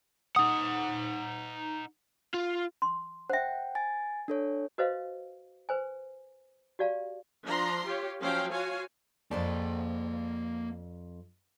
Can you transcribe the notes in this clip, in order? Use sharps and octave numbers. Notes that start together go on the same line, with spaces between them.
D#4 F#5 D#6
F4
C6
C5 E5 F#5 G5
G#5 A6
D4 A4 C#5
F#4 B4 C5 D#5 F5
B4 C5 G#5
F#4 G4 D5 F5 A5
F3 D4 A#5 C6
F4 G4 C#5
F3 F#3 C#4 C5 F5 G5
F4 F#4 C#5 F5 G#5
F2 A#3 C5 D5 A5